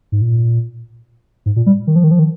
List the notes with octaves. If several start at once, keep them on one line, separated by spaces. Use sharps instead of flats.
G#2
A#2
G#2
A#2
G3
D#3
F3
D#3
F3
D#3